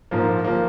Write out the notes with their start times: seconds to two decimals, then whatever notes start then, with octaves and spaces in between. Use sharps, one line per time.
0.11 G#2 F3 A#3
0.44 F3 A#3